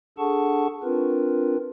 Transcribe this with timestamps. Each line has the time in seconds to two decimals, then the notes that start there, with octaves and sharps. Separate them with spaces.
0.18 D4 G#4 A4 F#5 A5 C#6
0.83 C4 D4 F4 A#4 B4